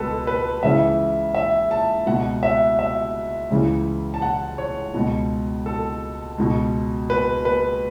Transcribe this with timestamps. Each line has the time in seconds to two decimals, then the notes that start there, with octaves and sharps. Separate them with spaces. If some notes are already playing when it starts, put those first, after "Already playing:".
Already playing: C#2 B2 A4 B4
0.27 B4
0.63 C#2 C#3 E3 E5
1.35 E5
1.71 A5
2.06 C#2 B2 F#5
2.43 E5
2.79 E5
3.50 C#2 C#3 E3
4.14 A5
4.22 F#5
4.58 C#5
4.94 C#2 B2
5.66 A4
6.38 C#2 B2
7.10 B4
7.45 B4